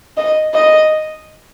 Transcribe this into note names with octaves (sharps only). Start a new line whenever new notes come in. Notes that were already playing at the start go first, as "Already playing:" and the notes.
D#5
D#5